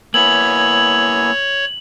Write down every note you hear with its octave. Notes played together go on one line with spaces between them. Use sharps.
A#3 B3 E4 C#5 G#5 E6 F#7